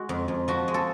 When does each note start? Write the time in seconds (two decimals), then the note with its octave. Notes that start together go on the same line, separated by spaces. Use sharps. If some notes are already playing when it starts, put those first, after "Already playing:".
Already playing: G#3 F#4
0.09 F2
0.28 F2
0.48 F3 F#4
0.68 G#3
0.74 A4